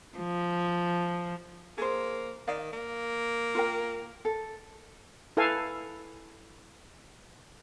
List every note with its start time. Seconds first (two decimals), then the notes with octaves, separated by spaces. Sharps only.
0.19 F3
1.78 A#3 G#4 C5
2.48 D#3 D5 F5
2.73 A#3
3.55 F4 A#4 G5
4.25 A4
5.37 E4 A4 B4 F5 G#5